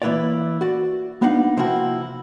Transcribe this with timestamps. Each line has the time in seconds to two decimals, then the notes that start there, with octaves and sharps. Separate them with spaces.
0.02 E3 A#3 E4 B4 C#5 D5
0.61 F#4 D5
1.21 A#3 B3 D4 D#4 F5 F#5
1.57 C3 F3 A#3 C4 E4 F#4